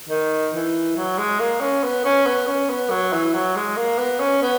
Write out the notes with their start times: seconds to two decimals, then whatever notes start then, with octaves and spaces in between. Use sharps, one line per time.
0.09 D#3
0.54 E3
0.96 F#3
1.18 G#3
1.39 A#3
1.60 C#4
1.83 B3
2.05 C#4
2.26 B3
2.47 C#4
2.69 B3
2.90 F#3
3.12 E3
3.34 F#3
3.56 G#3
3.76 A#3
3.98 B3
4.20 C#4
4.42 B3